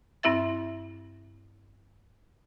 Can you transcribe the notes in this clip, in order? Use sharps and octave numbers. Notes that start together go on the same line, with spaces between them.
G2 C4 E4 E5 A6